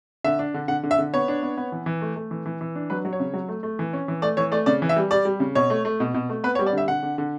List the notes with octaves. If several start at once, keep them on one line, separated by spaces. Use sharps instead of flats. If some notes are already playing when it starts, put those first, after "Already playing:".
D3 E5
D4
D3
D3 F#5
D3
E5
D3
B3 C#5
D4
B3
B3
E3
E3
A3
A3
E3
E3
E3
D4
F#3 B4
F#3
C#5
C#3
F#3
A3
A3
E3
C#4
E3
A3 D5
E3 C#5
A3 D5
C#3 D5
E3
E5
G3
G3 D5
G3
C#3
B2 C#5
A3
A3
B2
B2
A3
B3 B4
C#5
G3
D5
D3 E5
D3 F#5
D3
D3